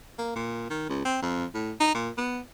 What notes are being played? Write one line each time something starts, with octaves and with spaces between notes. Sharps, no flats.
A#3
A#2
D#3
C#2
C4
F2
A2
D#4
A#2
B3